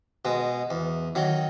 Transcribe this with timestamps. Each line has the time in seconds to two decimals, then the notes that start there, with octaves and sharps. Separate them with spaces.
0.25 B2 G#3
0.70 E2
1.15 D#3 F#3